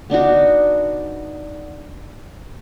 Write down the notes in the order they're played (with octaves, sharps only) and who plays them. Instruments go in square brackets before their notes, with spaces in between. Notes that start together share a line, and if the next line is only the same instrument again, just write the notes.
[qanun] B3 D4 D#4 F#4